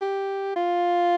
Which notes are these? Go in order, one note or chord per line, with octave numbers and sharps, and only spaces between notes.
G4
F4